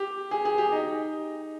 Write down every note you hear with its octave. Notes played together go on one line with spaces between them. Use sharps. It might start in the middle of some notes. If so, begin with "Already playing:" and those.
Already playing: G4
G#4
G#4
G4
D#4